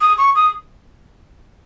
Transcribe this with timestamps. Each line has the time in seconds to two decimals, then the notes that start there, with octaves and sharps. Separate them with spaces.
0.01 D#6
0.18 C#6
0.35 D#6